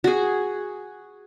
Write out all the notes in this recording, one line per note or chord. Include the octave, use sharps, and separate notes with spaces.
F#4 G#4